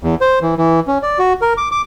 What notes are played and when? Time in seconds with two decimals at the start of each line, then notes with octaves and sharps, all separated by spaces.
0.03 E2
0.21 C5
0.42 E3
0.57 E3
0.87 C#4
1.03 D5
1.19 F#4
1.41 A#4
1.58 D6
1.71 D6